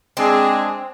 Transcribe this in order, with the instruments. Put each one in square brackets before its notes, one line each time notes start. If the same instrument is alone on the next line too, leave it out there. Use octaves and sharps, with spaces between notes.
[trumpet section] G#3 D4 G#4 [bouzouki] C4